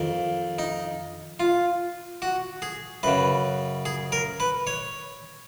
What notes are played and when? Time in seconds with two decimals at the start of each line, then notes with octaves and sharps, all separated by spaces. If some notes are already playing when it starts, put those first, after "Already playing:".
Already playing: F2 D#3
0.59 D#4
1.40 F4
2.22 F#4
2.62 G#4
3.03 F#2 C#3 B4
3.86 G#4
4.12 A#4
4.40 B4
4.67 C#5